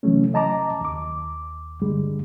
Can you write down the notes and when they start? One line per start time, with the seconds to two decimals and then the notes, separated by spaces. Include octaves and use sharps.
0.03 C3 E3 F#3 A3 C#4
0.34 D#5 A5 A#5 D6
0.81 D#2 D6
1.82 G2 D3 G3 G#3